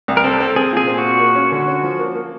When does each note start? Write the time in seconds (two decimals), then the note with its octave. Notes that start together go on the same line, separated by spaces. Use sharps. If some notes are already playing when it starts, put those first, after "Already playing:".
0.08 C2
0.17 A#4
0.24 C4 A4
0.40 C4
0.56 C4 G#4
0.73 A#2 G#4
0.87 C4
0.98 F#4
1.04 A#2
1.20 A#3
1.35 C#4
1.52 D3
1.67 C#4
1.83 F3
1.99 A#3
2.15 A#3